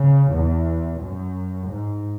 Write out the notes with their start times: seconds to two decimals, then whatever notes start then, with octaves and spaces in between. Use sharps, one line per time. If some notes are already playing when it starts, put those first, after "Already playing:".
Already playing: C#3
0.32 E2
1.00 F#2
1.68 G#2